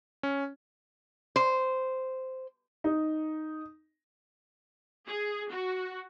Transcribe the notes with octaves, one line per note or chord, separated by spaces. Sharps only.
C#4
C5
D#4
G#4
F#4